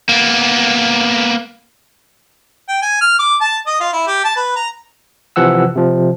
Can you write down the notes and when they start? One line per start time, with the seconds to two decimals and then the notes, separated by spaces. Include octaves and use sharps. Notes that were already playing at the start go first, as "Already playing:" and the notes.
0.09 A#3 B3
2.68 G5
2.82 G#5
3.01 F6
3.19 D6
3.41 A5
3.67 D#5
3.80 F4
3.93 E4
4.07 G4
4.24 A5
4.36 B4
4.56 A#5
5.36 C3 E3 F3 F#5 E6
5.75 C3 F3